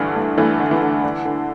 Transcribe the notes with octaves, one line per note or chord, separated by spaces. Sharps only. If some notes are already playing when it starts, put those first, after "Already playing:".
Already playing: G2 D3 E3 A3
G2
G2 E3 A3
D3
E3
D3
D3
D3